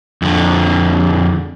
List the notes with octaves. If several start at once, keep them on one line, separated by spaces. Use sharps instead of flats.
F2 D3